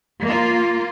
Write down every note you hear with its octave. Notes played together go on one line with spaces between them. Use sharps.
A#3 F4